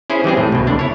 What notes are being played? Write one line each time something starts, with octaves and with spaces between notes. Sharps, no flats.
C#4 E4 G#4 C5
E3 G3 C4 G#4
A2
C2 B2
C#2 D3 D4
E4 C#5